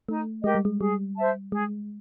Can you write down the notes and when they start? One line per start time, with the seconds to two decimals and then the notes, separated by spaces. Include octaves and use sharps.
0.08 A3 D#4
0.44 G#3 G4 A#4 D#5
0.55 G3
0.65 G#3
0.80 G3 G#4
1.16 C5 E5 A5
1.51 G#3 G#4